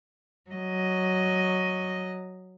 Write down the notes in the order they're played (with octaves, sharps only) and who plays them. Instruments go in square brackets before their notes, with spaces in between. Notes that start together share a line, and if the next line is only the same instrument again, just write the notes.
[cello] F#3 D#5